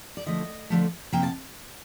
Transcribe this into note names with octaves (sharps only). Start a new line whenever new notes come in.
D5
D3 F3 A3 D#5
D3 F3 A3
C3 F3 A#3 G5
A5